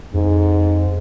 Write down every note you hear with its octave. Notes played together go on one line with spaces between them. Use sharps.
F2 G#2